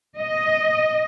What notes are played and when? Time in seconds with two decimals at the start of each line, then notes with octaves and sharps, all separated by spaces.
0.17 D#5